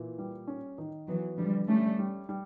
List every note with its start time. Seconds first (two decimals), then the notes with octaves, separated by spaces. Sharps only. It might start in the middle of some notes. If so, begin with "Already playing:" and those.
Already playing: A#2 E3
0.18 G3
0.47 C#4
0.78 D#3
1.08 E3 F#3 B3
1.38 D3 F3 G3
1.68 G3 A3 C#4
1.99 G3
2.29 G3